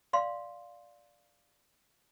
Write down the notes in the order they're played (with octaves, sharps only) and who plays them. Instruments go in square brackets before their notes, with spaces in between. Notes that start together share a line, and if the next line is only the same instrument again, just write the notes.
[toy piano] D5 F5 C6